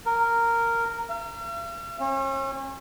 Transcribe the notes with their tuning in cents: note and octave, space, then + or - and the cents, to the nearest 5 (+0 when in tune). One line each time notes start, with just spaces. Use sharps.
A#4 -10
F5 -45
C#4 -40